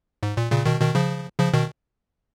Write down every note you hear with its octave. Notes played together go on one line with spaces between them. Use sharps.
G#2
A#2
A#2 C#3
B2 D#3
B2 D#3
C#3 F3
C#3 F3
B2 D#3